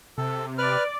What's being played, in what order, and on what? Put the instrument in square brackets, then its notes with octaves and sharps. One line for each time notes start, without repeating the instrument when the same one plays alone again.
[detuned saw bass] C3 [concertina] A4
[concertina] B4 F6 [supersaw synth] D5